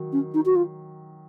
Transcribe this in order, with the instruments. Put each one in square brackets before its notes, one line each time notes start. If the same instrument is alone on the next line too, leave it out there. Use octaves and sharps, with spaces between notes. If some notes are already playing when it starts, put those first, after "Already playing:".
Already playing: [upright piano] D#3 F#3
[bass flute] C#4
D#4
F#4
F4